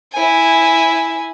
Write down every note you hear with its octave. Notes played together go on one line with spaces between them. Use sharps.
E4 G#5